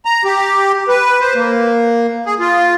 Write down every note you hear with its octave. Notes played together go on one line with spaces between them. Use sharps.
A#5
G4
B4
C5
A#3
G#4
F4